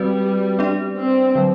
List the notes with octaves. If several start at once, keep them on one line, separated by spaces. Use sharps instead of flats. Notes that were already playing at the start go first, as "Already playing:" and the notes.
Already playing: G3 C4 F#4 B4 D5
B3 D4 G4 D5
C4
D3 F#3